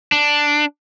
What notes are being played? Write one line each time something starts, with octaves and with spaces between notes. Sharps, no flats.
D4